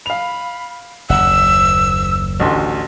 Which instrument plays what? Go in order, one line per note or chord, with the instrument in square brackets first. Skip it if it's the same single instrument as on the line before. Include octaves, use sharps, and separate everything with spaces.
[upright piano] F5 F7 [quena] B5
[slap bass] F#1 D#2 [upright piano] F#5 [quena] E6
[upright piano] A1 D2 C6